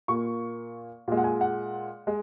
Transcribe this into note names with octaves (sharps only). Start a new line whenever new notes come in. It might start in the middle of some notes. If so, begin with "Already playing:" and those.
A#2 A#3 C#6
A#2 G#3
F#5
G#5
F#5
G#3